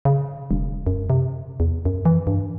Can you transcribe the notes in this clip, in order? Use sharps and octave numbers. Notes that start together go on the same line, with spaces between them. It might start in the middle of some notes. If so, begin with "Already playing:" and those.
C#3
E1
F#2
C3
E2
F#2
E3
G2